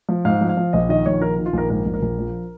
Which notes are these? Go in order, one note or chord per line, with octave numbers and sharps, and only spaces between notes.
F3
G#2 F5
F3
F5
F3
A#1 D#5
D#3 D#5
A#1 C#5
D#3 A#4
D#3
F4
A#1 A#4
G#2 A#4
A#1
A#4
A#1
F3